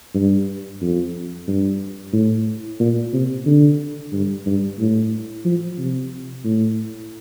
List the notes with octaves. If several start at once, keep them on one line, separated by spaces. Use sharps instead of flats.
G2
F2
G2
A2
A#2
C3
D3
G2
G2
A2
F3
C3
A2